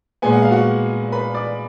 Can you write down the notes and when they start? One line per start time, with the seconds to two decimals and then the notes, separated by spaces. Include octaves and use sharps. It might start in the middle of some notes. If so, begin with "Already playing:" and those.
0.22 A#2 G#3 B3 G#5
0.33 F#5
0.42 F5
0.51 F#4 F#5
1.12 B4 B5
1.34 D5 D6